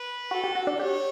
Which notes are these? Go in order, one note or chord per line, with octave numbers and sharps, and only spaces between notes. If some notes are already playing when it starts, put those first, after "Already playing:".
Already playing: B4
F#4 A4
G4
F#4
D4
G4 C#5